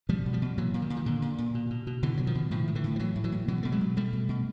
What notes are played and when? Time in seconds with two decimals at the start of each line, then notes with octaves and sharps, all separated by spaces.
0.09 B2 F3 G3
0.26 B2
0.33 F3 G3
0.42 B2
0.58 A#2 E3 F#3
0.74 A#2
0.82 D#3
0.90 A#2
0.97 D#3
1.06 A#2 D3
1.22 A#2
1.38 A#2
1.55 B2
1.70 B2
1.87 B2
2.03 B2 D3 E3
2.17 B2 F#3
2.27 D#3 F3
2.35 B2
2.51 A2 D#3 F3
2.68 A2 D#3
2.75 D3 E3
2.84 A2
2.96 F3
2.99 A2 E3 F#3
3.16 A2
3.24 E3 F#3
3.32 A2
3.48 B2 E3 F#3
3.63 B2 A3
3.72 F#3 G#3
3.81 B2
3.96 B2 G3 A3
4.13 B2
4.29 B2